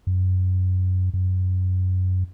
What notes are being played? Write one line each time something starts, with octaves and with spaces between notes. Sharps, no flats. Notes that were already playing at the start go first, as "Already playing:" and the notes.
F#2
F#2